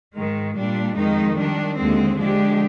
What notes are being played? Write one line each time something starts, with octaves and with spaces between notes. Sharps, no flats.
G#2 D#3 G#3
A#2 G3 D4
F2 D#3 G#3 D#4
D#3 G3 D4
D#2 D3 G#3 C4
D3 F3 G#3 D4 G4